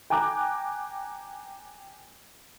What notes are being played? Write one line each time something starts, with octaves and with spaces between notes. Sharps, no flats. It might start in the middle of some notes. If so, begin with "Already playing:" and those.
G5 G#5 A#5 D6 F#6